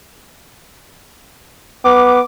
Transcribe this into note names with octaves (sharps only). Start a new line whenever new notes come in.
B3 D6